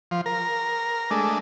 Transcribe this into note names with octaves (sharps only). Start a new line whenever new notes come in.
F3
A#4
G#3 A3 D4